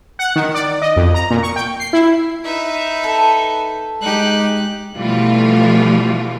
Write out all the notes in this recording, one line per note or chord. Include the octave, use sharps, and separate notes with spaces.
F#5
D#3
D5
D#5
F2
A#5
A#2
C#6
G5
C7
E4
D#4 B4 E5
A4
G#3 D#4 G4 F#6
B2 E3 F3 G3 A3 F4